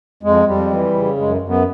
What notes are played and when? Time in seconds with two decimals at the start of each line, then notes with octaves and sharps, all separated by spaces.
0.23 F2 G#3
0.46 F2 G3
0.71 E3
0.94 C#3
1.18 F#2 G#3
1.41 F#2
1.49 B3